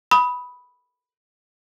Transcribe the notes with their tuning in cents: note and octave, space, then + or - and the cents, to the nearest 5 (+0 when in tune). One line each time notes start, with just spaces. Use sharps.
B5 +0 D#6 +20